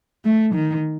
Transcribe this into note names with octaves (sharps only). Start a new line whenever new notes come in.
A3
D#3